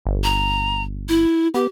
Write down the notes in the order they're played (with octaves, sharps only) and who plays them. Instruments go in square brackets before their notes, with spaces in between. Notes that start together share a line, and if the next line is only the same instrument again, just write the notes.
[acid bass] G1
[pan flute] A#5
E4
[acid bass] B3 [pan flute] G4